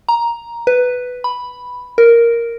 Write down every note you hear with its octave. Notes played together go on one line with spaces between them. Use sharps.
A#5
B4
B5
A#4